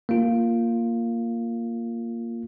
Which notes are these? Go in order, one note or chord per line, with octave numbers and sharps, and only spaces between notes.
A#3 F4